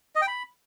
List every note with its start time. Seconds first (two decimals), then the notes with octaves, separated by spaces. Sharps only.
0.16 D#5
0.22 G5
0.28 B5